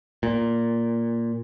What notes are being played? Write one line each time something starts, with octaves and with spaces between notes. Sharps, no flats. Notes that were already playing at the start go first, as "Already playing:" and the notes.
A#2